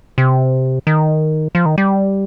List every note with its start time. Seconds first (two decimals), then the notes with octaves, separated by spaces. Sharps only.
0.18 C3
0.87 D#3
1.55 F3
1.66 D#3
1.78 G3